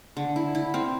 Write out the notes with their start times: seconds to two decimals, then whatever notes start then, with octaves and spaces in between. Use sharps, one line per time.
0.17 D3
0.36 E4
0.55 E4
0.74 C4